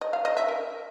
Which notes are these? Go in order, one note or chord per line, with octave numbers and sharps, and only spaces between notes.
D#5
F5
D#5
E5
A#4